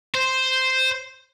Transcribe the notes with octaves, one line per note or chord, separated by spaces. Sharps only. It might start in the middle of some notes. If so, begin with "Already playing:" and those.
C5